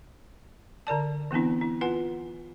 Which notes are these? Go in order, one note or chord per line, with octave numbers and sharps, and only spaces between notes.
D3 A#4 D5 A5
E3 B3 C4 D4 E4
E4
F4 B4 F#5 G#5